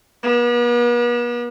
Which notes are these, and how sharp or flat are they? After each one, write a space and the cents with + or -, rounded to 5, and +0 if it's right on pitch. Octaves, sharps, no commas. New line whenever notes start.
B3 -45